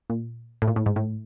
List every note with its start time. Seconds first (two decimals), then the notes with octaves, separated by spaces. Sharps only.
0.10 A#2
0.62 A2
0.68 A#2
0.76 A2
0.86 G#2
0.96 A2